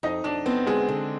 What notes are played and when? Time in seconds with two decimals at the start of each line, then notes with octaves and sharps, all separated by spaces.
0.03 F2 D#4 D#5
0.24 F2 D4 D5
0.46 B3 C4 C5
0.67 D3 G#3 G#4
0.89 D3